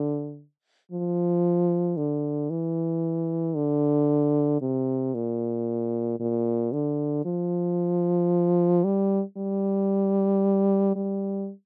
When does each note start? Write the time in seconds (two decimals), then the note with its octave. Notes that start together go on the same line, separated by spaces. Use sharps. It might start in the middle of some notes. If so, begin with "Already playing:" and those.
Already playing: D3
0.92 F3
1.97 D3
2.50 E3
3.56 D3
4.61 C3
5.14 A#2
6.20 A#2
6.73 D3
7.25 F3
8.84 G3
9.37 G3
10.96 G3